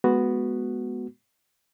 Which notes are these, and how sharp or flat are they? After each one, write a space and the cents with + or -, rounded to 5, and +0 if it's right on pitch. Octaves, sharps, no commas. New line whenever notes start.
G#3 +30 B3 +0 F#4 +0